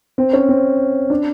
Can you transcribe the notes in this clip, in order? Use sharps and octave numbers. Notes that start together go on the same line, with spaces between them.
C4
C#4
C4
D4